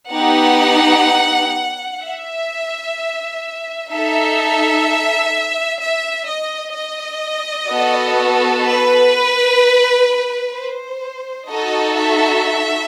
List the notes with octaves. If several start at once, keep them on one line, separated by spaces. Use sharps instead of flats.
B3 D#4 G4 F#5
E5
D#4 A4 E5
E5
D#5
D#5
B3 F#4 A4
B4
C5
D#4 F#4 A4 D#5
E5